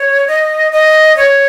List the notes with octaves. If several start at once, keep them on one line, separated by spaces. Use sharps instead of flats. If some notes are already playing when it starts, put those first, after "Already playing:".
Already playing: C#5
D#5
D#5
C#5